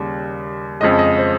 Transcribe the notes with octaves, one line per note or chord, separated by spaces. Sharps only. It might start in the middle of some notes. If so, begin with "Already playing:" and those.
Already playing: D#2 C#3 G3
F2 C#3 F3 G#3 D#5
D#5
C5